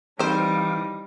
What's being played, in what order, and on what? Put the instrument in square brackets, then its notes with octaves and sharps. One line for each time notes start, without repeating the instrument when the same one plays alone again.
[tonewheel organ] E3 F5 D6 [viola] G3 D#4 [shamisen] C4 C5